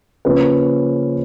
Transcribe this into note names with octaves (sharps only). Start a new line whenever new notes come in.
C#3 F3 A#3 C#4 B4